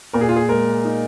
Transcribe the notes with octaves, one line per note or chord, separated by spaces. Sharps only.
A#2 A#4
G#4
F4
G#4
G#3 A#4
D#4